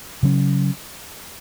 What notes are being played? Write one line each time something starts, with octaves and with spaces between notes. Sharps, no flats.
C#3 F#3 C#4